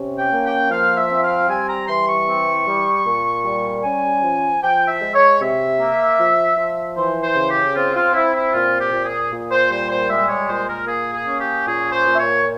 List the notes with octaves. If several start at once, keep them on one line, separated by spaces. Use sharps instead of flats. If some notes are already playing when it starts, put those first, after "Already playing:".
Already playing: C3 C#4
G5
A#3
G5
F3 F5
E5
C4
F5
G3 G#5
A#5
E3 C6
C#6
C4
G3
A#2
G3
C#4 G#5
F3
F3 G5
E5
G#3
C#5
C3 E5
A#3
F3
F3
E3 C5
C5
C#3
G4
C4 F4
F4
C4 E4
E4
A#2 F4
G4
A#2
G#4
A#2
C5
G3 C5
C5
G#3 E5
C#5
A#2 C5
A#4
A#3 G#4
G#4
C#4
G4
A#2 G#4
C5
A#2
E5
C#5